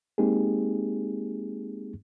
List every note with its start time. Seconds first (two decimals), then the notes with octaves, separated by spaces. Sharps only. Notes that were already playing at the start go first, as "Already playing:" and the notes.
0.18 G#3 A#3 C4 D#4 G4 G#4